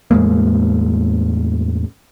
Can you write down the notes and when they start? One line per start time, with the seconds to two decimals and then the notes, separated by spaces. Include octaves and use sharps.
0.11 E2 A2 G#3 A#3